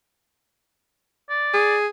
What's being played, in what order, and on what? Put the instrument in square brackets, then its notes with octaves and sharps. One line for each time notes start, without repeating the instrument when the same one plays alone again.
[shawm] D5
[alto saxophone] G#4